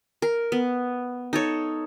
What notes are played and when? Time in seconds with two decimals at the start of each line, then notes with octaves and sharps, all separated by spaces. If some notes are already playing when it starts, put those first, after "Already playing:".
0.22 A#4
0.52 B3
1.33 D#4 A4 C#5